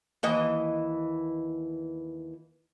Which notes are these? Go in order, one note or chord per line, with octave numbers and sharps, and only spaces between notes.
D#2 E3 D#5